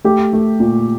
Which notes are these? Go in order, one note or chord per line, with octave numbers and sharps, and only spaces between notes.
A3 G4
A3
A#2